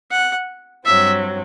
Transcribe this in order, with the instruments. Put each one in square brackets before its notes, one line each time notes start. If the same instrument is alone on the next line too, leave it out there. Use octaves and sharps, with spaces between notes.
[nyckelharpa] F#5
[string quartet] G2 F#3 C4 [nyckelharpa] E5